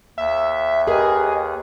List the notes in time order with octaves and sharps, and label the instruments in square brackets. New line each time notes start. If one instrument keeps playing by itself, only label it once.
[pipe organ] D#2 [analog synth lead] E5
[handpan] G4 A#4 B4 [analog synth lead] G#4 [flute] D#5